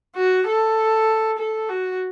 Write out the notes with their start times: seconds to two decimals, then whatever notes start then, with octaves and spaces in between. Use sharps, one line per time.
0.16 F#4
0.47 A4
1.38 A4
1.69 F#4